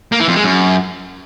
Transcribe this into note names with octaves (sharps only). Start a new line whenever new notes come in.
A#3
E3
F2
G#3
F#2